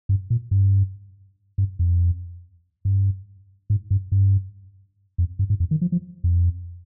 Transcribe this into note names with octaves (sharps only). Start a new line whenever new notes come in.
G2
A#2
G2
G2
F2
G2
G#2
G2
G2
F2
G2
G#2
F2
D#3
F3
F3
F2